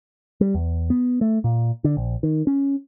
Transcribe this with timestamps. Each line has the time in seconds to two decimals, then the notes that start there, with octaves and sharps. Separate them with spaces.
0.41 G3
0.54 E2
0.90 B3
1.21 A3
1.44 A#2
1.84 D3
1.97 A#1
2.23 D#3
2.47 C#4